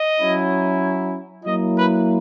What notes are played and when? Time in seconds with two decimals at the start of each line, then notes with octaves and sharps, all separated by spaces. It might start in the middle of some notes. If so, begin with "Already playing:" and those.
Already playing: D#5
0.18 F#3 C#4 E4
1.44 F#3 A#3 E4 D#5
1.76 B4